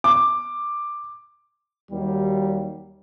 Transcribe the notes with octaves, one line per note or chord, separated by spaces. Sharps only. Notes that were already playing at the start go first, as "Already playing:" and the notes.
D6
D#2 D#3 F#3 G3